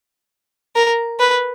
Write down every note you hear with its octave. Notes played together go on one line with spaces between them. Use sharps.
A#4
B4